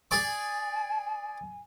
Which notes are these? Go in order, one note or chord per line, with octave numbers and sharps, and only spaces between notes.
G#4 D5 G#5 D6